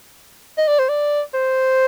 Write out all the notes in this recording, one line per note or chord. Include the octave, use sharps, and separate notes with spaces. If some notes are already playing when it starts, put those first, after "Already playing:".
D#5
D5
C5
D5
C5